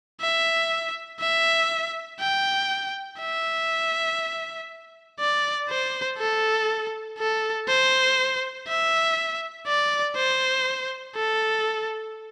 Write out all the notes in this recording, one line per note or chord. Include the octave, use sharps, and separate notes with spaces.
E5
E5
G5
E5
D5
C5
A4
A4
C5
E5
D5
C5
A4